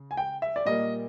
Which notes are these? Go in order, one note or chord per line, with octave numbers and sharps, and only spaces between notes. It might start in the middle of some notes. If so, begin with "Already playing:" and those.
Already playing: C#3
G#5
G5
E5
D5
A#2 G3 A#3 D#5